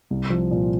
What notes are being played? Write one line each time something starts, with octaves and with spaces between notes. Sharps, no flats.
C2
F3
A#2